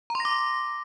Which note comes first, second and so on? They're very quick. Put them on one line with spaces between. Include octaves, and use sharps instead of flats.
A#5 C6 A#6 D6